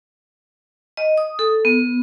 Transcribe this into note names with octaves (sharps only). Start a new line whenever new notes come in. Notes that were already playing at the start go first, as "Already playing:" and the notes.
D#5
D#6
A4
B3